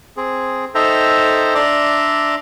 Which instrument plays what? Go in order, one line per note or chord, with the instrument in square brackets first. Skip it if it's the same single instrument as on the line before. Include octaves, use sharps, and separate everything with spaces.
[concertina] C4 G#4
D#4 A4 C5 E5 G5 A#5
D4 D5 E5 A#5 C6 D6